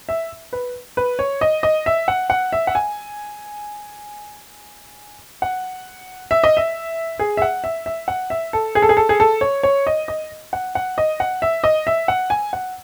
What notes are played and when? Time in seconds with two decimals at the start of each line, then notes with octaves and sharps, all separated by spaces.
0.09 E5
0.53 B4
0.97 B4
1.19 C#5
1.41 D#5
1.63 D#5
1.86 E5
2.08 F#5
2.30 F#5
2.53 E5
2.67 F#5
2.75 G#5
5.42 F#5
6.31 E5
6.44 D#5
6.57 E5
7.19 G#4
7.37 E5
7.42 F#5
7.64 E5
7.86 E5
8.08 F#5
8.30 E5
8.53 A4
8.75 G#4
8.82 A4
8.89 G#4
8.97 A4
9.09 G#4
9.20 A4
9.41 C#5
9.63 C#5
9.87 D#5
10.08 D#5
10.53 F#5
10.75 F#5
10.98 D#5
11.20 F#5
11.42 E5
11.64 D#5
11.87 E5
12.08 F#5
12.30 G#5
12.53 F#5